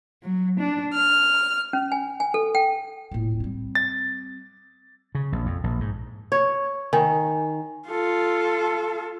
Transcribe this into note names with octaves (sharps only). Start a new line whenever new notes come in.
F#3
D4
F6
C#4
G#5
G#5
A4
G5
D#1 A2
G3 C4
A6
C#3
A#1
F2
A#1
G#2
C#5
D#3 G#5
F4 A4